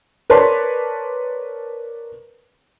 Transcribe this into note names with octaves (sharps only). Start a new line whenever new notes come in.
A#4 B4 C#5 D5 A5 C6